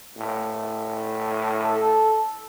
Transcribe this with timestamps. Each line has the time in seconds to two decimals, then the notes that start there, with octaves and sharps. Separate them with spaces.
0.17 A2
1.63 A4